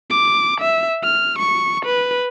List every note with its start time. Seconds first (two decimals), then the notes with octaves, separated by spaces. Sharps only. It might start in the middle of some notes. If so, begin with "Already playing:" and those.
0.10 D6
0.60 E5
1.03 F6
1.39 C#6
1.85 B4